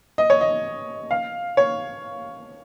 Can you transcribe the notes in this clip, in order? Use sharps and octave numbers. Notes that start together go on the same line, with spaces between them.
D#5
C#5
D#5
F5
C#5